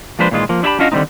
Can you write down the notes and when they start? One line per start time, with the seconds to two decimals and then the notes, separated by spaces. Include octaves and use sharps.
0.19 F3 G#3 A#3 D4 B4 C5
0.31 A#2 D#3 E3 G#3 F4
0.49 F3 A#3
0.63 D4 E4 G4 C#5 A5 B5
0.79 C#4 D4 F4 F#4 D#5 F5
0.92 D3 D#3 G3 A3 C4 D#4